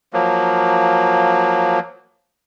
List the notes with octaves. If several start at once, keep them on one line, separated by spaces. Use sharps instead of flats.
F3 F#3 A#3